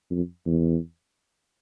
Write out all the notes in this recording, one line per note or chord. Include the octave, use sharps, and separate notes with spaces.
F2
E2